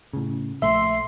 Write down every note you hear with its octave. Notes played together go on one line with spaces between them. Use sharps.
A2 C#3
A#1 A3 E5 C6